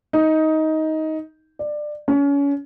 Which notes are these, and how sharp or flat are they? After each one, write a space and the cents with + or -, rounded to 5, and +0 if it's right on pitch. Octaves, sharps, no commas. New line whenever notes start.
D#4 +15
D5 +20
C#4 +30